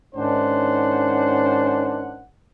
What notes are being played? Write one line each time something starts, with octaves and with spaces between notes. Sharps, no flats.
G#2 D#3 C#4 D4 C5 F#5